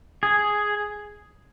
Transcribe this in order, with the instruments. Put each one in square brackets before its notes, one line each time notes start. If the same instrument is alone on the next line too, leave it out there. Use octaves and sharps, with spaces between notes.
[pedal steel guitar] G#4